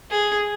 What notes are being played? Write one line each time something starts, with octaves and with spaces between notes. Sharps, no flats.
G#4